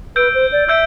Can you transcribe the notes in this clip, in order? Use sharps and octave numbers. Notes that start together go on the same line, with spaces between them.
B4 E6 G6 D7
C5
D5
E5 E6 G6 D7